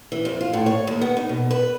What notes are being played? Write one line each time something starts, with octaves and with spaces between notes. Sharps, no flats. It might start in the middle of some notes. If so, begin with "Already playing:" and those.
E3
F2
F4
A2
C#5
D#2
B3
D#4
B2
B4